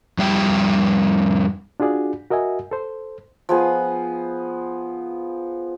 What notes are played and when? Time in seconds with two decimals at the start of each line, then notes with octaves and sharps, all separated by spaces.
0.18 F2 G3 E5 G5
1.80 D4 F4 F#4 G#4 D5
2.30 F#4 A#4 D#5 E5 G#5
2.71 A4 C5
3.49 F3 B3 G#4